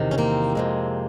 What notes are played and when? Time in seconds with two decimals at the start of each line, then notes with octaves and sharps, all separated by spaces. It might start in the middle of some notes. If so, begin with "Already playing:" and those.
Already playing: E2 C3 D#3
0.11 C#4
0.18 A#3 C4
0.55 F2 C3 E3 G#3